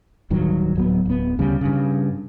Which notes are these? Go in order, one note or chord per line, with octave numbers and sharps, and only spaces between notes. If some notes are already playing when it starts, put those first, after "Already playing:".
D1 G2 D#3 F#3
D1 F#3 B3
D1 B3
D2 C#3 G3
G2 C#3